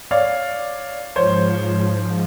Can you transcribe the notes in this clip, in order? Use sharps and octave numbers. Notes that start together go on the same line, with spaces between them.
C#5 D5 F5
G#2 F3 C5 C#5